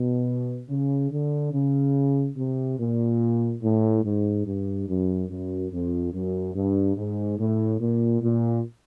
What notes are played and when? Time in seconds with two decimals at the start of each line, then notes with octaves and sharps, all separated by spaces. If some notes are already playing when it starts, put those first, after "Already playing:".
Already playing: B2
0.69 C#3
1.11 D3
1.52 C#3
2.36 C3
2.78 A#2
3.62 A2
4.04 G#2
4.46 G2
4.88 F#2
5.29 F#2
5.71 F2
6.13 F#2
6.55 G2
6.96 G#2
7.38 A2
7.80 A#2
8.22 A#2